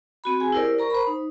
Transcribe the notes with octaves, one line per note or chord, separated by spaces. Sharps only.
C4 F#4 B5
G#4 G#5
E4 G4 A#4 C5 D5
A#4 A#5 C#6
C5 B5
D#4